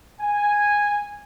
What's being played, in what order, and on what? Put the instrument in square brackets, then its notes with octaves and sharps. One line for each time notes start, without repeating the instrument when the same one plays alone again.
[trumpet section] G#5